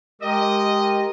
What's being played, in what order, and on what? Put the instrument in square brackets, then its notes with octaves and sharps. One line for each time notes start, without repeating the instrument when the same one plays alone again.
[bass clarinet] G#3 [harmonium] G4 A#4 [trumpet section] D#5